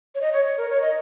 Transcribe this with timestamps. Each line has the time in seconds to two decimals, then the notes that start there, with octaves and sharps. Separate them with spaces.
0.15 C#5
0.21 D#5
0.33 C#5
0.45 C#5
0.57 A#4
0.70 C#5
0.81 D#5